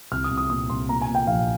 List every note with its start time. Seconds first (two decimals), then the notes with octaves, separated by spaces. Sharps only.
0.11 C2 F6
0.24 D#6
0.31 C2
0.37 D#6
0.50 A#2 D#6
0.70 C2 C6
0.89 A#2 A#5
1.02 G#5
1.08 A#2
1.15 G5
1.27 A#1 F5